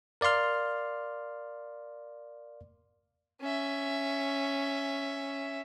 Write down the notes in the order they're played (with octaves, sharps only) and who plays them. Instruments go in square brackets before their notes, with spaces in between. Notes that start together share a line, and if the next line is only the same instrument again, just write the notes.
[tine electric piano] A#4 D5 F5 C6 F6
[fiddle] C#4 E5